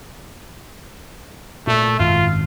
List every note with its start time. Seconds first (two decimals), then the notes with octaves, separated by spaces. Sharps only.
1.67 A#2 A3
1.99 G#1 F#2 F4